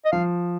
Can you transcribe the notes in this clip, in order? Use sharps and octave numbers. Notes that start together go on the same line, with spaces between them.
D#5
F3 F5